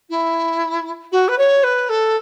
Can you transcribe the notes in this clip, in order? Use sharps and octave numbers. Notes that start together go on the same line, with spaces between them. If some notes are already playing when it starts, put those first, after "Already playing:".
E4
F#4
B4
C#5
B4
A4